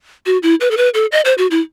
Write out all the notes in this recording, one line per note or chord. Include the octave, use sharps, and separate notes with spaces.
F#4
E4
B4
A4
B4
A4
D#5
C5
F#4
E4